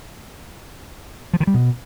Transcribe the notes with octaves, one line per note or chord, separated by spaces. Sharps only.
F3
D#3
G3
B2